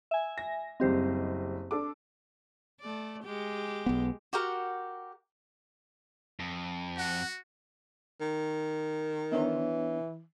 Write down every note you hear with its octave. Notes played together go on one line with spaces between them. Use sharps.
E5 G#5
A#6
F#1 G3 C4 G4 C5 D#5
D4 A4 D6
A3 D5
G#3 G4
B1 B3
F#4 G4 A#4 F#5
F2
F#4 F#5
D#3
E3 B3 D4 C#5